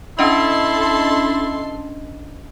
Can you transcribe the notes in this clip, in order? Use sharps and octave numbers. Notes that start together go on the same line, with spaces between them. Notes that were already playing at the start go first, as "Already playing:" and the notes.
C#4 D4 E4 A4 D#5 C6